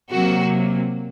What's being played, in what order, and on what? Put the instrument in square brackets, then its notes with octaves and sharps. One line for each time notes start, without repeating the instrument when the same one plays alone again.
[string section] C3 F#3 A#3 F#4